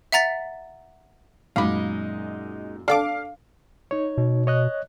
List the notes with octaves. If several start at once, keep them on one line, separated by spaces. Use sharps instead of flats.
E5 F#5 A#5 A6 B6
F#2 A#2 G#3 D#4 F5 B5 D6
D4 A4 F5 D6
D#4 C#5
B2
C#5 D#5 F#6